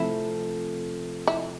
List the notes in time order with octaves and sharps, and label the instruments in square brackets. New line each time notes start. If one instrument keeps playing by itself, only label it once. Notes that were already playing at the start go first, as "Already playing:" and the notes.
Already playing: [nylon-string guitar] C3 F3 A3 C4 [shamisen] E4
[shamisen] E4